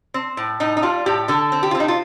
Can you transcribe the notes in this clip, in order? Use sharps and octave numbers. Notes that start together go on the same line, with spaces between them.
C4
A2
A2 D#4
D#4
G3 F4
A2 G4
D3 A4
C4
G4
F4
C4
D#4
F4